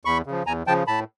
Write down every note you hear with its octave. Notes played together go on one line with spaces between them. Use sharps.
E2 B5 C#6
C#3 F3
E2 G#5 A#5
C#3 F3 G5 A5
A2 A5 B5